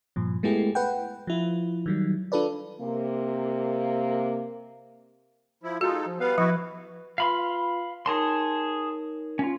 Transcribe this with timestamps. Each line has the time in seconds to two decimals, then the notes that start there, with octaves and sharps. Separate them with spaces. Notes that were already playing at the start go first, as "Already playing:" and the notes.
0.16 G2 A#2 F3
0.43 G#3 A3 B3 E4 G4 G#4
0.75 B4 F#5 G5
1.27 F3 E4 F4
1.86 D#3 F#3 G3
2.32 D4 F4 A4 B4 D5
2.81 C3 A#3
5.63 F3 E4
5.81 G#3 D#4 F4 F#4 A4
6.06 F3
6.20 G3 B3 B4 F5
6.38 F3 E4 F#4
7.18 F4 B4 F5 B5 C6
8.06 D#4 G#4 A#4 C#5 A5 C6
9.39 C#4 F4